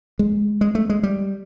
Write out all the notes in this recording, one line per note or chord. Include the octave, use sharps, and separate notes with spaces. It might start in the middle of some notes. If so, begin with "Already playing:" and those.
G#3
G#3
A3
G#3
G3